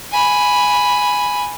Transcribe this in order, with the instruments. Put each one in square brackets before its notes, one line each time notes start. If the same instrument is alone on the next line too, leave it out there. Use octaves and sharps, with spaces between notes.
[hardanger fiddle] G#5 B5